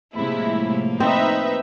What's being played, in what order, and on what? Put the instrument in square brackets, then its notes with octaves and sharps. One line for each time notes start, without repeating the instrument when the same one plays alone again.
[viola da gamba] A2 F3 A#3 [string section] C3 G#3 E4
[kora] C4 [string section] D#4 B4 E5